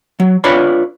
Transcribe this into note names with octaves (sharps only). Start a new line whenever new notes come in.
F#3
D4 F4 B4 C#5 D5 B5